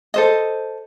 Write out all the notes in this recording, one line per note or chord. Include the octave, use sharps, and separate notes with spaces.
A4 C5 D#5